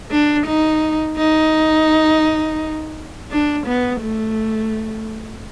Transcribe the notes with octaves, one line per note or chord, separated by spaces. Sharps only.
D4
D#4
D#4
D4
B3
A3